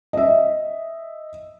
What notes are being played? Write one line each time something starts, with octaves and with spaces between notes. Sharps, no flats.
D#5 E5